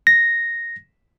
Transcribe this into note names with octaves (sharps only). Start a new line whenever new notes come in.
A#6